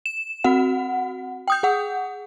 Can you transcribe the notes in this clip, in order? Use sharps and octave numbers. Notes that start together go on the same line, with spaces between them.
E7
C4 F#4 F#5
G5 D#6 G6
G#4 F#5